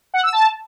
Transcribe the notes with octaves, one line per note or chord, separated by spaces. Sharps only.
F#5
E6
A5